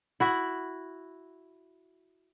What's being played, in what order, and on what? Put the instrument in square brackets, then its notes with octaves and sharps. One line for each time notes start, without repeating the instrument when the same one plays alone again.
[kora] E4 F#4 E5